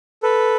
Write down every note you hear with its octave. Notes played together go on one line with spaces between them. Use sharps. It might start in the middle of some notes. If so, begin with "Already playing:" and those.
A4 B4